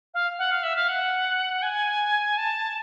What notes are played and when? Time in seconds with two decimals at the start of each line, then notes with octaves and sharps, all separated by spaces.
0.14 F5
0.38 F#5
0.51 F5
0.63 E5
0.76 F5
0.88 F#5
1.62 G#5
2.37 A5